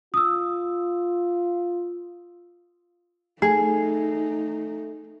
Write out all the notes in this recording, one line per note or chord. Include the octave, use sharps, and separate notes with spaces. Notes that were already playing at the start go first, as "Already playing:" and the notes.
F4 D#6 E6
A3 D#4 G#4